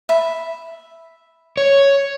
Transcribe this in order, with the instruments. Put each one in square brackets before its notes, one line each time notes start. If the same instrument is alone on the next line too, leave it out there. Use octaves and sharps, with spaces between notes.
[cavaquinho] E5 B5
[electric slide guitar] C#5